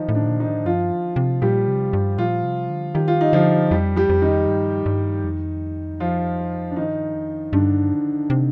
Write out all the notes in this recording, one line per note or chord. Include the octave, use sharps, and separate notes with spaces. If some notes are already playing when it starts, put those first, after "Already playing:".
Already playing: D#3 F3 D#4
A2
D3 D4
A#2
D#3 D#4
A2
G2 F3 F4
C3
A#2 G3 G4
C3
G2
A#2 F3 F4
C3
D3
D#3 G4
F4
D#4
D3 F3 F4
F2 G3 G4
G3 G4
F2
D#3 D#4
G2
G2
F2
F3 F4
D4
G2 D#3 D#4
F2
G2 D3 D4
C3